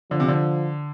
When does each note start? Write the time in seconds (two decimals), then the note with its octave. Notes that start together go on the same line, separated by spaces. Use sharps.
0.11 D3 F3
0.20 C3
0.28 D3